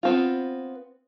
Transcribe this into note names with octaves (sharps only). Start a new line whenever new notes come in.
B3 C4 F4